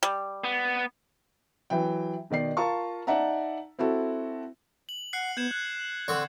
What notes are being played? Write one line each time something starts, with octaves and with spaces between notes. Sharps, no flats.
G3
B3
E3 F#3 G5
B2 D#3 D5 C7
F4 A#4 A5 A#5 C#6
D#4 D5 E5 F#5 A5 A#5
C4 E4 F#4 A4
F#7
F#5 F#6 C7 C#7
B3 G6 G#6 E7
F#6
D3 C4 C#6